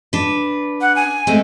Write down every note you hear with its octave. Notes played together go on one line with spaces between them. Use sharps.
D4 B4
F#5
G#5
G#3 A3 C4